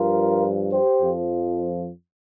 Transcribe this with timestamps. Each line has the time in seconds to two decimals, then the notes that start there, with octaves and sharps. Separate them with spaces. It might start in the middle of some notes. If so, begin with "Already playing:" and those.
Already playing: G2 F3 F4 A#4
0.72 G4 C5
1.00 F2 F3